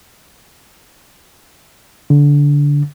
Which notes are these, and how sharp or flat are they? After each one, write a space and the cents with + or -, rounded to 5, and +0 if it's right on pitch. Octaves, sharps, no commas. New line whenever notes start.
D3 -20